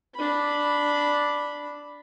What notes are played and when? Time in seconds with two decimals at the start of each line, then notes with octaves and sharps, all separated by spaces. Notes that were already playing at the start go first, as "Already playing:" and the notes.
0.15 D4 B5